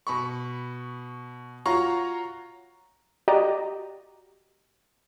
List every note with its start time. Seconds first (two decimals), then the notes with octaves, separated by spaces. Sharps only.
0.07 B2 B5 C#6
1.66 F4 F#4 C#5 A#5 C#6
3.28 F#4 G4 D5 D#5 A#5